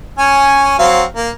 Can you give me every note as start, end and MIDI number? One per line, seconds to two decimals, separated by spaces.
0.19 0.75 61
0.19 0.75 80
0.79 1.03 54
0.79 1.03 60
0.79 1.03 77
1.16 1.29 58